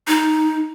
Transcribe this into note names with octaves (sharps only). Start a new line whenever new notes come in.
D#4